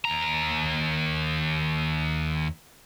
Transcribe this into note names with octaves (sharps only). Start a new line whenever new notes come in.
D#2 A#5